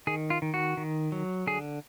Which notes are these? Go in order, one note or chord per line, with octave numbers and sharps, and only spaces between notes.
D#3 G#4
F4
D#3
F#4
D#3
F#3
D3 G#4